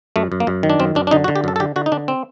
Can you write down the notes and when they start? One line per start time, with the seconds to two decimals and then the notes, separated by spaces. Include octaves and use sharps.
0.16 F#2 A3
0.32 F#2
0.40 A#3
0.47 F#2
0.63 D#3
0.70 D4
0.80 F#2 C4
0.95 F#2 D4
1.07 D4
1.11 D3 D#4
1.24 F#4
1.28 D3
1.36 G4
1.44 F#2 A4
1.56 A4
1.60 D3 G4
1.76 D3 F#4
1.86 D#4
1.92 D3 D4
2.08 C4